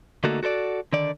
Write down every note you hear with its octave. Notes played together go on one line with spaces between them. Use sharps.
D3 A3 A#3 D#4 F#4 A4
F#4 A4 C5 D5
D3 D#3 D5